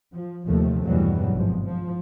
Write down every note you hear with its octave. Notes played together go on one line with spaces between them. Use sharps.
F3
D#2 C3 F3 A3
E2 G2 B2 E3 F#3 G3
G#1 G#2 F3
F3